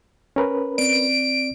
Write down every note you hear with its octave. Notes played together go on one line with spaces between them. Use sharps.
C#4 A#4 B4
C4 D5 D7